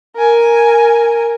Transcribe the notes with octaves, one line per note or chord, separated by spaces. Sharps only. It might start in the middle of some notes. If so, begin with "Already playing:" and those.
A#4 G#5